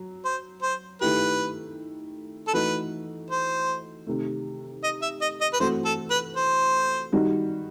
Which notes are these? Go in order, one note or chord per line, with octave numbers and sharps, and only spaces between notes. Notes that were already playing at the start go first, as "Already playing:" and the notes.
Already playing: F#3
C5
C5
D#3 A3 E4 G4 B4
A4
E3 A3 D#4 F#4 B4
C5
C3 D#3 A3
D#5
E5
D#5
D#5
B4
E3 A3 C4 F#4 C5
A4
B4
C5
D#3 G3 D#4 F#4